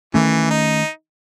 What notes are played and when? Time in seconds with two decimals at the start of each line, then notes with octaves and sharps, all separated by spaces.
0.14 D#3 E3 A3 C#4
0.50 D#4